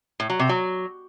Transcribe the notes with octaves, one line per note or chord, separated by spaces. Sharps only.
A2
F#3
C3
F#3